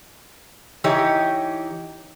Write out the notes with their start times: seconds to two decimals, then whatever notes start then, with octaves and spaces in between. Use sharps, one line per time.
0.84 E3 D#4 G4 C#5